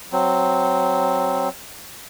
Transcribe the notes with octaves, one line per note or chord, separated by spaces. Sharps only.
F#3 C4